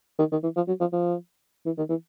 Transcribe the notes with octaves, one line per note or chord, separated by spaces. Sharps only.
D#3
D#3
E3
F3
F#3
F3
F3
E3
D#3
E3